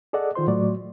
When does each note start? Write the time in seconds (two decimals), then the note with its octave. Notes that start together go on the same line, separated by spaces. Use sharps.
0.13 G#4 A4 D5 D#5 F#5
0.35 D#3 F4 C5 C6
0.47 A2 F#3 A3 F#4 D5